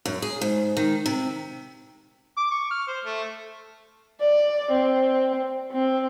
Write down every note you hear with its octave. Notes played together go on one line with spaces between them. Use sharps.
F#2
G#4
G#2
D#3
C3
D6
C#6
F6
C5
A3
D5
C4
C4